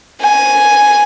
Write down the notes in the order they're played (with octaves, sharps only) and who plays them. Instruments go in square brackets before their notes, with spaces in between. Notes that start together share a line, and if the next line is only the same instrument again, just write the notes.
[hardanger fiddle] G#5